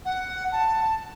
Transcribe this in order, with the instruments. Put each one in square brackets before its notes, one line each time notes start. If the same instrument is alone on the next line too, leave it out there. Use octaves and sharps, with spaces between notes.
[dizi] F#5
A5